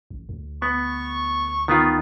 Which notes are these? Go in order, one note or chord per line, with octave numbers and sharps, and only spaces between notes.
A1
D2
B3 C#6
D#3 B3 F4